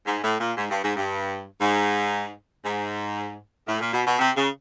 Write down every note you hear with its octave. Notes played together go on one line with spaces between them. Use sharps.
G#2
A2
A#2
G#2
G2
G#2
G2
G#2
G#2
A2
A#2
B2
B2
C3
C#3